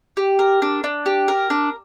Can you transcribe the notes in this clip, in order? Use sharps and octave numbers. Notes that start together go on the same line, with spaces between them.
G4
A#4
D4
D4
G4
A#4
D4